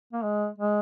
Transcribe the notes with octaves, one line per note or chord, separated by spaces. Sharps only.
A#3
G#3
G#3